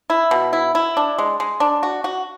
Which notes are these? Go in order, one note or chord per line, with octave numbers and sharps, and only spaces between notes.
E4
B2
E4
E4
D4
G#3
G#3
D4
F#4
F#4